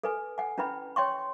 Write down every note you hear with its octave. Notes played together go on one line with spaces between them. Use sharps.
A4 B4 G#5
F#5 G#5
C#4 E4 B4 G5 B5
C#5 G5 C6 C#6